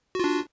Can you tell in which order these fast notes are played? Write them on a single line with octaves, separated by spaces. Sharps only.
F#4 F4 D4